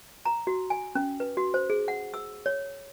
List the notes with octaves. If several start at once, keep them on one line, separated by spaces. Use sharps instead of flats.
A#5
F#4
G#5
C#4
B4
F#4
C5
G#4
F#5
E6
C#5